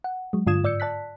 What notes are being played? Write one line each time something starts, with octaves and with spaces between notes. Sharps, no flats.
F#5
F#3 G#3
G2 D3 F4 D#6 G#6 E7
G#2 D5 E6 G6 C#7
D5 A5 F#6 B6